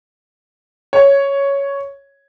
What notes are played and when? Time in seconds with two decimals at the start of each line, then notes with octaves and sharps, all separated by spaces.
0.93 C#5